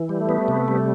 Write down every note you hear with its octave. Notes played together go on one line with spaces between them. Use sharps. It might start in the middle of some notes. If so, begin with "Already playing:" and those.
Already playing: E3
G3
A3
B3
C3
G3